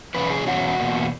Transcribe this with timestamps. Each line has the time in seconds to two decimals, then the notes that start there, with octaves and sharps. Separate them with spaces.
0.14 E2 B2 F#3 C#4 B4
0.30 G#4
0.46 E2 B2 F#3 C#4 F#4
0.80 E2 B2 A#3